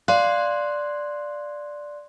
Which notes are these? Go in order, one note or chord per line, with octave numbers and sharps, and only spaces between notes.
D5 F5 C6 F#6